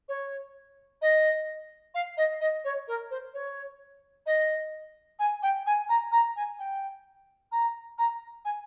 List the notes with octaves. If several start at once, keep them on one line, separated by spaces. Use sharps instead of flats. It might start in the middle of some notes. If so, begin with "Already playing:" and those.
C#5
D#5
F5
D#5
D#5
C#5
A#4
C5
C#5
D#5
G#5
G5
G#5
A#5
A#5
G#5
G5
A#5
A#5
G#5